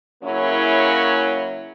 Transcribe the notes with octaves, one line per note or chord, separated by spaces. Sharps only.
C#3 F#3 A#3 C#4 E4